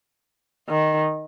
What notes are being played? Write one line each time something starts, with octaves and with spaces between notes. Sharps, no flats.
D#3